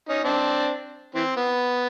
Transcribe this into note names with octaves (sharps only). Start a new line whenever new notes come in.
C#4 D#4
C4 D4
E3 C4
B3